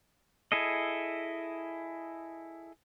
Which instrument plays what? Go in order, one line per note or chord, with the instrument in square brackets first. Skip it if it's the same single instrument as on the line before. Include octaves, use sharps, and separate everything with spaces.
[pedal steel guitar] E4 G#4 A4 D#5